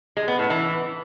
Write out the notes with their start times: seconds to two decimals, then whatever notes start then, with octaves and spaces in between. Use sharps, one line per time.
0.17 G#3
0.28 B3
0.39 A2
0.50 E3